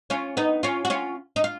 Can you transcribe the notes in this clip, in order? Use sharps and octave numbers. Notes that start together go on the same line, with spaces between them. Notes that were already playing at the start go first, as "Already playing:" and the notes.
C#4 F4
B3 D#4
C#4 F4
F#4
C#4 F4
D#4
F4